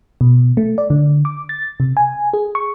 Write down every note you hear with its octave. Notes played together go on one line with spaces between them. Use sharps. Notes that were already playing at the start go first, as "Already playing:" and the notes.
B2
A3
D5
D3
D6
A6
C3
G#5
G#4
C#6